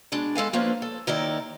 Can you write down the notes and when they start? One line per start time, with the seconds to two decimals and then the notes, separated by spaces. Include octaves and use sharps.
0.12 B2 G#3 D4
0.35 G#3 A4 F5 G#5
0.53 F3 A#3 C#4 D4 B4 C5
0.82 A4
1.07 D#2 D#3 D#4 E4 D5